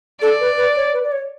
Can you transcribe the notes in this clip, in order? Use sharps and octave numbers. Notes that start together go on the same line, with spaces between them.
A4 D5
B4
B4
C#5
B4
D5
C#5